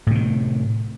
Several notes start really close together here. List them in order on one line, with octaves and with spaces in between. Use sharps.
A2 C3 D#3